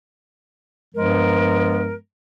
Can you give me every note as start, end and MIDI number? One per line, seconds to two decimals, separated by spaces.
0.95 1.94 43
0.95 1.94 53
0.95 1.94 56
0.95 1.94 59
0.95 1.94 70